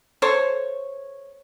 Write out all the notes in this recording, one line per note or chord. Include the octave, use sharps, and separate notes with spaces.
A4 C5 C#5